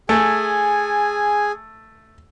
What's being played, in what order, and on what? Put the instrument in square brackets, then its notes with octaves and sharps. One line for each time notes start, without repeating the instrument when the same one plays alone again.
[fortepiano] A3 [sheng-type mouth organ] G#4 G#5